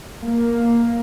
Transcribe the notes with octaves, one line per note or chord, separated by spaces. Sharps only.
A#3